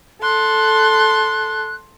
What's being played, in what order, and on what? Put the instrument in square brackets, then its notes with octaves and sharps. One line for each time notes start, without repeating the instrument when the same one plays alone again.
[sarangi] A4 [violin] C6 [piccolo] F#6